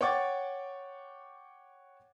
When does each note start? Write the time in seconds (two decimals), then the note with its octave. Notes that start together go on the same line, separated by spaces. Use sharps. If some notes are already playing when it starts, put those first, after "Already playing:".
0.01 C#5 F#5 G5 C#6 D6 A6